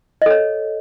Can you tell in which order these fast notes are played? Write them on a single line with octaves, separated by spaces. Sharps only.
D#5 A4 C#5